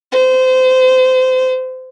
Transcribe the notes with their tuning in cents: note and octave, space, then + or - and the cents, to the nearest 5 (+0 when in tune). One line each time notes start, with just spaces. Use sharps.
C5 -25